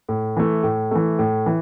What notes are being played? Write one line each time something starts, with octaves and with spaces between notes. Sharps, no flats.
A2
E3 A3
A2
E3 A3
A2
E3